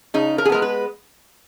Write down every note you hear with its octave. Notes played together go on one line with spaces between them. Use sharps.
C#3 D#4
A#4
G#4
G#3 B3 A#4
B4